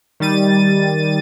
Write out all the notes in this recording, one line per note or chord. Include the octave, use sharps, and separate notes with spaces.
D#3 G3 A6 D#7